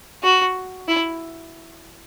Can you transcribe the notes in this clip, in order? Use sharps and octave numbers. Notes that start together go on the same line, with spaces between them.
F#4
E4